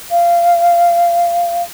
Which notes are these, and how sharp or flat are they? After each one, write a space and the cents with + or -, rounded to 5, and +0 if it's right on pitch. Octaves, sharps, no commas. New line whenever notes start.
F5 -20